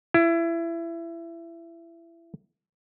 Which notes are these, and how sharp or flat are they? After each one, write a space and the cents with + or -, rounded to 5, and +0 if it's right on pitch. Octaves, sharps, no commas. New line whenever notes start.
E4 +25